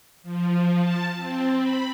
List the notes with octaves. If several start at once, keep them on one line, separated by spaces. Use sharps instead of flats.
F3
A5
C4
B5